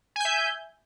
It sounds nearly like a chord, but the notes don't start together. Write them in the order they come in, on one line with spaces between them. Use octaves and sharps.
G#5 G6 E5